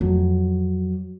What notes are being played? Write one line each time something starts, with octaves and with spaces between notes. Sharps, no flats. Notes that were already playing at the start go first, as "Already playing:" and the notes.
F2 F#3